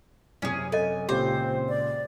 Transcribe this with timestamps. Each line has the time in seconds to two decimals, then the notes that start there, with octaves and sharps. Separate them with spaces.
0.42 F#2 C3 C#4 G#4
0.72 A4 C#5 D#5 G#5
1.09 C#2 A#2 C#3 C4 G4 C5 D6
1.69 D5